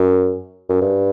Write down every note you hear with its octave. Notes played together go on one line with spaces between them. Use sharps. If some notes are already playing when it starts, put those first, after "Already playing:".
Already playing: F#2
F#2
G2